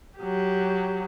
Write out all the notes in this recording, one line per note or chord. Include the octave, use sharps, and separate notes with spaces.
F#3 G4